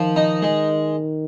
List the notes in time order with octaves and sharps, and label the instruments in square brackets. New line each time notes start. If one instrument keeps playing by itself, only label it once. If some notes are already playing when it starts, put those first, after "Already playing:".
Already playing: [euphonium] D#3 [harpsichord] F3
[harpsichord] D#4
G#3